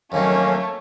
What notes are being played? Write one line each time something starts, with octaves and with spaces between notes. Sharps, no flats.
F2 D#3 F#3 A3 A#3 C#4 C#5